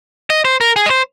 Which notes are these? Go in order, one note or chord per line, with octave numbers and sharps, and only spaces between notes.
D#5
C5
A#4
G#4
D#5
C5